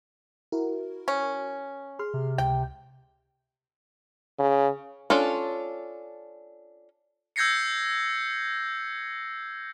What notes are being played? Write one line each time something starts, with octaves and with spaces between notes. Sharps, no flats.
E4 F#4 A#4
C#4
G#4 C6 F6
C3
C#2 G5
C#3
C#4 D4 F4 A4
E6 G6 G#6 A#6 C7 C#7